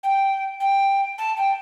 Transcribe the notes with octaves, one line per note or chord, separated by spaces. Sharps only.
G5
G5
A5
G5